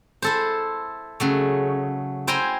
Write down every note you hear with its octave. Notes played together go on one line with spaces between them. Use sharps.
E4 A4 C5
C#3 F#3 A3
E4 C5 G5 G#5 A#5